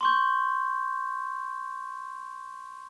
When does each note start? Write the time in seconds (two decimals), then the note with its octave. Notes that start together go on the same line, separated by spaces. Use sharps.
0.01 C6 C#6 G6